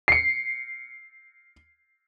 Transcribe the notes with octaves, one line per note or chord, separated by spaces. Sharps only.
C7 C#7